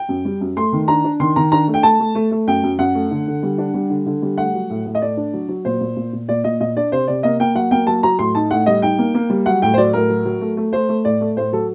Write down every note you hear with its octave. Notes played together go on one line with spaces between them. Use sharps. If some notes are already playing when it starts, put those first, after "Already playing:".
Already playing: G5
F#2
G3
F#2
A3 C6
D#3
D4 A#5
D4
D#3 C6
D#3 A#5
D4 A#5
A3
G5
A3 A5
A3
A3
A3
F#2 G5
F#2
F#2 F#5
A3
D3
D3
G3
D4
G3
D3
D3
G3
A3 F#5
F#3
A2
A2
D#5
A3 D5
D4
F#3
F#3
A#2 C5
A#2
A#2
A#2
A#2 D5
A#2 D#5
A#2 D#5
D4 D5
C3 C5
C3 D5
A#3 D#5
A#3 G5
F#3 F#5
A#3 G5
F#3 A5
F#3 A#5
A2 C6
D#4 A5
A2 F#5
G3 D#5
D#4 G5
A#3
A#3
G3
F#3 F#5
A2 G5
C5
F#3 D5
A2 A#4
F#3
F#3
A3
A3
A3 C5
A3
A2 D5
A3
A2 C5
F#3 A4